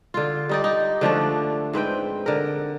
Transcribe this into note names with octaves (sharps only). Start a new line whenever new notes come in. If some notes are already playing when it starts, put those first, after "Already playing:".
D3 F4
G3 D#4 D5
D#4
D3 F3 A3 D4
G#2 C4 B4 G5
D3 A#4